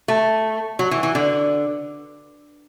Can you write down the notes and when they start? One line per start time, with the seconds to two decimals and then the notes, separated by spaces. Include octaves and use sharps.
0.08 A3
0.79 F#3
0.91 E3
1.03 E3
1.15 D3